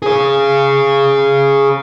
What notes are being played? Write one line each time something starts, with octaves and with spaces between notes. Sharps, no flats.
G#4 C#5